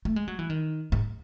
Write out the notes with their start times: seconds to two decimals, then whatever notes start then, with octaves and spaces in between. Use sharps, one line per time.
0.05 A3
0.16 G#3
0.28 F#3
0.39 E3
0.50 D#3
0.92 G#2